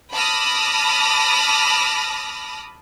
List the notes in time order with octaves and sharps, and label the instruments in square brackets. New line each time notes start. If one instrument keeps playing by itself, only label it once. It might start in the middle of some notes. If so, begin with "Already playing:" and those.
[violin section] A5 B5 D6 D#6 F6 A#6